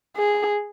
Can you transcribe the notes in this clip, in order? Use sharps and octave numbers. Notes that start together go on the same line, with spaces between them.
G#4